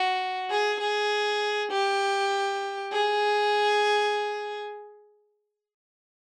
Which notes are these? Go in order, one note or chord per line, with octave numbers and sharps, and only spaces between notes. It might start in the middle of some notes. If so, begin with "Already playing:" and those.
Already playing: F#4
G#4
G#4
G4
G#4